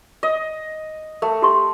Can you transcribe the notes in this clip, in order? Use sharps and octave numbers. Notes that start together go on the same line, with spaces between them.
D#5
A3 A#4
G4 C6 C#6